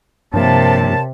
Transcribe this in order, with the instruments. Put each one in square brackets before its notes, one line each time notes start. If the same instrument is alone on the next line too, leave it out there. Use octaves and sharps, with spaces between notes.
[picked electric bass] G2 F3 A#3 [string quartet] C3 [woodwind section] A#4 C#5 A5